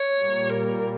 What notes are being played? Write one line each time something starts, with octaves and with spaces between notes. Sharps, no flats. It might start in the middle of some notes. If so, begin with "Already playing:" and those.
Already playing: C#5
A#2 G3 A#3
A#4